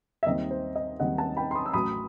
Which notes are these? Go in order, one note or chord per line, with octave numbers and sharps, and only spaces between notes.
E5
D#2 D#3 G3 C4 D#5
C5
D#5
D#2 D#3 G3 C4 D#5 F#5
F#5 A5
G5 B5
C6
B5 D#6
E6
A1 A2 F#3 B5 D#6